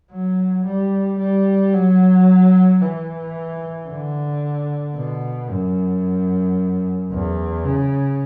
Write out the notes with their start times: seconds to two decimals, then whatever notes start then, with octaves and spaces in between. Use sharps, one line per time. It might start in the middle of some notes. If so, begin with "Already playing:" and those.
0.11 F#3
0.66 G3
1.20 G3
1.73 F#3
2.82 E3
3.89 D3
4.96 B2
5.50 F#2
7.12 E2
7.64 C#3